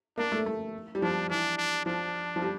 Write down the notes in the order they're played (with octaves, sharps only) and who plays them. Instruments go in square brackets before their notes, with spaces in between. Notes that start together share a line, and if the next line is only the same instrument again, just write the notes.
[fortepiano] A#3 [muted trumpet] D4
[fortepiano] A3
A3
G3
[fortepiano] F3 [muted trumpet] D4
[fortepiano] E3 [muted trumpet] D4
[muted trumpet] D4
[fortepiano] F3 [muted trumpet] D4
[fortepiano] F3
G3